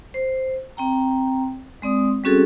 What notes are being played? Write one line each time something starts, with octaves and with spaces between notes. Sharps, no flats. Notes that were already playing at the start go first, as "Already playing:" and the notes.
C5
C4 G5 A#5
G#3 C4 D5 D#6
G3 C4 C#4 F#4 G#4 A4